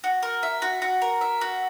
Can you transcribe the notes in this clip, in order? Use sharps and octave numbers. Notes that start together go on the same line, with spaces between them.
F#4
A#4
E5
F#4
F#4
A#4
E5
F#4